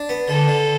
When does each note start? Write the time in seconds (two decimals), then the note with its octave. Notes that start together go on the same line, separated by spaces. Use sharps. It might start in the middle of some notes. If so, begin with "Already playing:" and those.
Already playing: D4
0.09 B3
0.28 D3 A4
0.48 D3